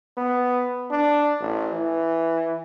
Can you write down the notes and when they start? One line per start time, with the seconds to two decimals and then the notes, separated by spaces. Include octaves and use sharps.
0.17 B3
0.91 D4
1.40 A1
1.72 E3